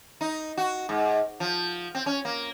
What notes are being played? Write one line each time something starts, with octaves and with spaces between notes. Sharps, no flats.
D#4
F#4
G#2
F3
C4
C#4
A#3